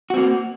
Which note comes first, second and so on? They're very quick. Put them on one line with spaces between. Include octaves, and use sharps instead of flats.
F#4 C4 A#3